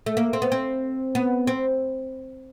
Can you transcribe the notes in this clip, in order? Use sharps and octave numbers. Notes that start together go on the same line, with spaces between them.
A3
A#3
C4
B3
C4
B3
C4